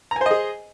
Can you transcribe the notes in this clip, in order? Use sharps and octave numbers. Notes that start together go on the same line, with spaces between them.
G#4 C5 D#5 G#5 A#5